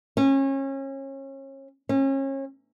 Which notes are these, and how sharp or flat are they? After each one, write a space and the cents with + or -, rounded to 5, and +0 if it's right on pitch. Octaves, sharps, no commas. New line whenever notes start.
C#4 -30
C#4 -35